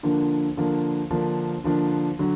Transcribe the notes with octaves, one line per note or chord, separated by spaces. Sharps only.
D3 F3 A#3 D4
D3 F3 A#3 D4
D3 F3 A#3 D4
D3 F3 A#3 D4
D3 F#3